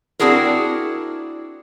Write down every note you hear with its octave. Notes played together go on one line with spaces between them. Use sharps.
C4 D4 E4 F#4 G#4 A#4